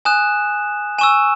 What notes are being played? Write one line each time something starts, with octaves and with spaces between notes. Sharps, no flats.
G#5 D#6 F#6 E7
G#5 C#6 E6 E7